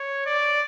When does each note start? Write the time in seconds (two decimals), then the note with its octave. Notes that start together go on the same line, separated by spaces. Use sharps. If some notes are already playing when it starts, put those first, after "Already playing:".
Already playing: C#5
0.26 D5